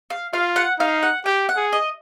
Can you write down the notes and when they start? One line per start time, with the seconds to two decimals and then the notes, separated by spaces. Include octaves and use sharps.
0.10 F5
0.33 F4 F5
0.56 F#5
0.80 D#4 F5
1.03 F#5
1.26 G4 G5
1.49 F#5
1.57 G#4
1.73 D#5